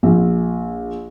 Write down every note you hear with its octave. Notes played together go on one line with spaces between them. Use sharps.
A#1